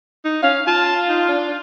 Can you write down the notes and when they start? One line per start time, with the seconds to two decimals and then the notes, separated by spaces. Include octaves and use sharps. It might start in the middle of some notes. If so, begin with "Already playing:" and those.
0.25 D#4
0.43 C#4 F5
0.67 F4 A5
1.09 D#4
1.28 D4